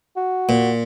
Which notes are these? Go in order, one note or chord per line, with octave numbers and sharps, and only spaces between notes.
F#4
A#2